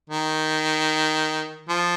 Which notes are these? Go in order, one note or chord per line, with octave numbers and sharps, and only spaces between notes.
D#3
F3